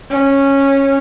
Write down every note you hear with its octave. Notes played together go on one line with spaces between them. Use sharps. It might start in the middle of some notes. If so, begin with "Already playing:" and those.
C#4